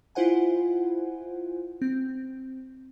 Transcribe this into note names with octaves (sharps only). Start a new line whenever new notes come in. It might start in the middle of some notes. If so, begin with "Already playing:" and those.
E4 F4 C5 F#5 G#5
C4